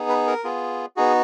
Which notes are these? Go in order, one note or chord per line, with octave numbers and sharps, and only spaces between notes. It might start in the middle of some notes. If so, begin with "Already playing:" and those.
Already playing: B3 D#4 G#4
B4
A#4
B3 F4 G#4
B3 D#4 F#4 G#4